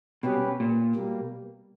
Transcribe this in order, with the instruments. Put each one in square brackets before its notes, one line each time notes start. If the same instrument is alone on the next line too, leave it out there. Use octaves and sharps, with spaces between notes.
[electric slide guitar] B2 [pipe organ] G3 C#4 G4 B4
[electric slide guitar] A#2
[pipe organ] B2 G3 A#3